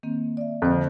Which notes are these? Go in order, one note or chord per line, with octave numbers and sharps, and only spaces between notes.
D#3 A#3 C4
D5 E5
F2 D3 C5